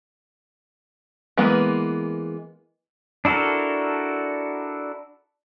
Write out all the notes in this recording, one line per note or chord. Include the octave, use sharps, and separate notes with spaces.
E3 G#3 A#3 B3
D4 E4 F#4 A4 A#4